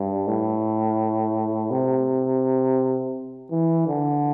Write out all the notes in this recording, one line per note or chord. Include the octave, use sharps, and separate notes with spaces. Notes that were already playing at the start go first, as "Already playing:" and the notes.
Already playing: G2
A2
C3
E3
D3